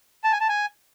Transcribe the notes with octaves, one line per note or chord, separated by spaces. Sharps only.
A5
G#5
A5
G#5